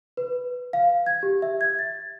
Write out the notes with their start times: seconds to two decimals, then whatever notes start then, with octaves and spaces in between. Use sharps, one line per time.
0.17 B4
0.73 F5
1.06 G#6
1.23 G4
1.42 E5
1.61 G#6
1.79 A6